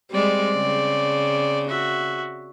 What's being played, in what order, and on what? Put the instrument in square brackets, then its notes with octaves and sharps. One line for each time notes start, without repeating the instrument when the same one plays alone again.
[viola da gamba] G3 G#3 [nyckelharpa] C4 D5
[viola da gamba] C#3
[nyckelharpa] F#4 E5